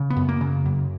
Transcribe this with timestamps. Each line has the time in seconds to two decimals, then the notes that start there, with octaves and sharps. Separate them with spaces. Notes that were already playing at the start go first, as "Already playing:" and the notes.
Already playing: C#3
0.10 B3
0.16 F#2
0.29 A#3
0.41 C#3
0.65 F#2